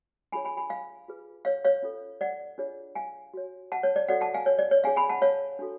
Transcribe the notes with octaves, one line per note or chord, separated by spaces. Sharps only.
D4 F4 G#4 C#5 G#5 B5
G#5 B5
G#5 B5
F5 G#5
F4 G#4 B4
C#5 F5
C#5 F5
C#4 F4 A4 C#5
D5 F#5
D4 F4 G#4 C#5
F5 G#5
F#4 C#5
F#5 A5
C#5
D5
F#4 A4 C#5 D5 F#5
F#5 A5
F5 G#5
C#5
D5
C#5
D4 G#4 C#5 F5 G#5
G#5 B5
F#5 A5
C#5 F5
D4 F#4 A4